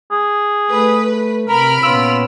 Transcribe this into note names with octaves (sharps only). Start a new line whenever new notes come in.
G#4
A3 B4
C3 A#4 B5 F6 D7
A#2 B3 C#4 F4 E6